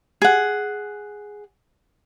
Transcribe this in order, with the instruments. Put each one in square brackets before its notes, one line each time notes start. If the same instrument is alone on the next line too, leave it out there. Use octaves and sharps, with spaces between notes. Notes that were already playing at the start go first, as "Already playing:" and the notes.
[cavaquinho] G#4 F#5